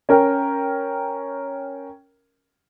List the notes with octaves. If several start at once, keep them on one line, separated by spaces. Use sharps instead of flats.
C#4 A#4 G5